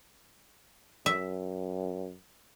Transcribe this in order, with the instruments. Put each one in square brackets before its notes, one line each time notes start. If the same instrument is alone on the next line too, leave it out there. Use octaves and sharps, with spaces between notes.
[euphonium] F#2 [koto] E5